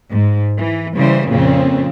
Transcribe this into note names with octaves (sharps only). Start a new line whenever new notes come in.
G#2
E3
C#3 E3 G3 C5
F2 A#2 C#3 C4